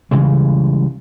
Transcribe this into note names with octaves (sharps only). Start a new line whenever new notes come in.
C#3 E3 G3 G#3